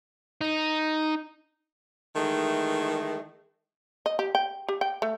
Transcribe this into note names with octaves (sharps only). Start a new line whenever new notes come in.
D#4
D#3 E3 G#3 A3
D#5
G4
G5
G4
G5
A3